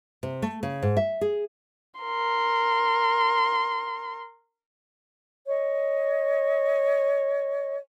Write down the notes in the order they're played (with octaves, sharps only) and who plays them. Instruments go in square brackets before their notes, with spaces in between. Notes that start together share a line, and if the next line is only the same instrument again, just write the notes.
[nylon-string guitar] C3
A3
C#3
G#2
E5
G#4
[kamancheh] A#4 C6
[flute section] C#5 D#5